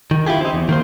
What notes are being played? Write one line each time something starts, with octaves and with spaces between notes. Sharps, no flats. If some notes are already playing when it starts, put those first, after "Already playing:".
D#3
E4 F4 G4 G#4
C4 D#4
E2
D#3 A#3 C5